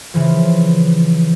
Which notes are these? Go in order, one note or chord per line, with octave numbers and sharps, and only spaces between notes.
C#3 E3 F3